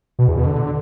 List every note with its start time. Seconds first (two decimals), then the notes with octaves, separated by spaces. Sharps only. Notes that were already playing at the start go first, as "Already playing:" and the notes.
0.19 B2
0.28 E2
0.37 B2
0.46 D3